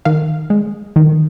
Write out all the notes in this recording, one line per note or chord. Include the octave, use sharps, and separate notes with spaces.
D#3 F5
G#3
D#3